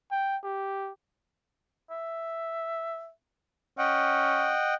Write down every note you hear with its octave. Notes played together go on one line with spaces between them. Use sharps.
G5
G4
E5
C#4 D#5 F#5 G5